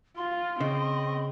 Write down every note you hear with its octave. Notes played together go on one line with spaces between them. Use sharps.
F4 C6
C#3 C4 D#5